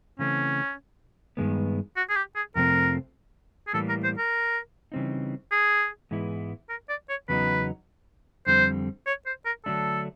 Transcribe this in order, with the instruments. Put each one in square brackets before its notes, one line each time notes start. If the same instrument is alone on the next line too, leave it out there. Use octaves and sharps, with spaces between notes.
[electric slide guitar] C#3 E3 A3 C4 [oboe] C#4
[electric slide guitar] G2 D#3 G#3 B3
[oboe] F#4
G#4
G4
G#4
[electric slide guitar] F2 C3 F3 A3 C4 [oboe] A#4
[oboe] G#4
[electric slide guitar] A2 E3 G3 A#3 [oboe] A4
[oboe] A#4
C5
A#4
[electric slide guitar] C#3 E3 G3 C4 D#4
[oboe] G#4
[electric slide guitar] G#2 E3 G#3 B3 E4
[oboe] A#4
D5
C#5
[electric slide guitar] E2 C#3 F#3 B3 D#4 [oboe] B4
[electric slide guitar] F2 D3 G3 C4 [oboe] C5
[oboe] C#5
C5
A#4
[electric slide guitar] D3 F#3 A3 D4 [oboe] A4